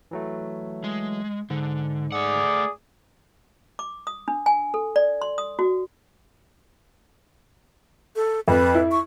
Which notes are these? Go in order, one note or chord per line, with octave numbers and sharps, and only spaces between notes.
E3 F#3 A3
G#3
G#2 D3
A3 G#4 D5 F#5
D6
D#6
D4
G#5
A4
D5
C6
D#6
F#4
A4
F2 B4
E4
C#6